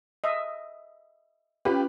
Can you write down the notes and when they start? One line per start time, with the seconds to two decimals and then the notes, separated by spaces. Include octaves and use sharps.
0.24 D#5 E5
1.65 C#4 F4 G4 B4